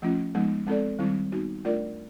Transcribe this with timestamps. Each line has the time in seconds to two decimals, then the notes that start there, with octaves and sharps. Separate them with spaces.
0.02 F3 A3 C#4 F4
0.35 F3 G#3 B3 D#4
0.67 G#3 C4 E4 A4 D5
0.99 D#3 G3 C4 E4
1.32 B3 D#4 F#4
1.65 A3 D4 F4 A#4 D5